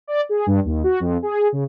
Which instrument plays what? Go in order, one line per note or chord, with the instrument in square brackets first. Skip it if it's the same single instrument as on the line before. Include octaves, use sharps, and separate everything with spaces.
[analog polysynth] D5
G#4
G2
D#2
F#4
F2
G#4
C#3